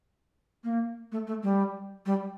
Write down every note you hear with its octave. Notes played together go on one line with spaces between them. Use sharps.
A#3
A3
A3
G3
G3